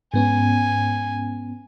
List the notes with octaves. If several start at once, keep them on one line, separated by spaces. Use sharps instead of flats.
G#2 B3 C#4 G#5